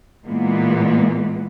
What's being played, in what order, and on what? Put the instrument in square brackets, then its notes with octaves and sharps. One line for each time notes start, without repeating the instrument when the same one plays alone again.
[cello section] A#2 E3 G#3 A#3 B3